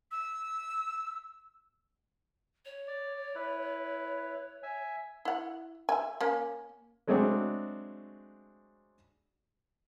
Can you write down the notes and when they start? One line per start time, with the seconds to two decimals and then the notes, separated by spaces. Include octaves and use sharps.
0.11 E6
2.65 C#5
2.88 D5
3.35 E4 B4
4.63 E5 G#5
5.25 E4 F#5
5.89 E5 G#5
6.21 A#3 C#4
7.07 F#3 G#3 A3 C4 D4 F#4